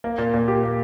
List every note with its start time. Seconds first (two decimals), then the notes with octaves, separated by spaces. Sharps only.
0.04 A#3
0.18 A#2
0.34 A#2
0.48 G4
0.63 A#3